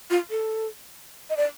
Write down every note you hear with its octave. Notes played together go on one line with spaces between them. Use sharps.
F4
A4
D#5
D5